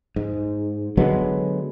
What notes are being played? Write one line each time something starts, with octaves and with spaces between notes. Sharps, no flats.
G#2
D3 F#3 G#3 B3